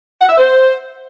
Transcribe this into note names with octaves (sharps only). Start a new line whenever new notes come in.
F#5
E5
C5